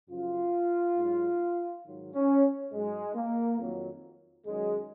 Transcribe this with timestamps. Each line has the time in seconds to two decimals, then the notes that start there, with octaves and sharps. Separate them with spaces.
0.09 F#2 C#3 F3 F4
0.97 G#2 F#3
1.84 G#2 D#3 F#3
2.13 C#4
2.72 G#2 F#3 G#3
3.15 A#3
3.59 F2 D#3 F#3
4.46 F#2 D#3 F#3 G#3